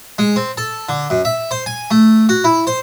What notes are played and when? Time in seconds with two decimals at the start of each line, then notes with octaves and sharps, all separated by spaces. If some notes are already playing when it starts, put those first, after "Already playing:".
0.18 G#3
0.36 C4
0.57 A4
0.89 D3
1.10 F#2
1.25 E5
1.51 C5
1.66 G#5
1.91 A3
2.29 F#4
2.44 E4
2.67 C5